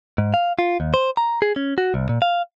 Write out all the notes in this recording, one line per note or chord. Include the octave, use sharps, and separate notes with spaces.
G#2
F5
F4
D#2
C5
A#5
G#4
C#4
F#4
C2
A#2
F5